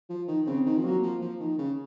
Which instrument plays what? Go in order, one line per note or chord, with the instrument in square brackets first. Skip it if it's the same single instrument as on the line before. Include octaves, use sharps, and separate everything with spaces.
[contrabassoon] F3
D#3
[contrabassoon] C#3 [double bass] C4
[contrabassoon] D#3
F3
[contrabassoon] F#3 [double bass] A#3
[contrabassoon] F3
F3
D#3
C#3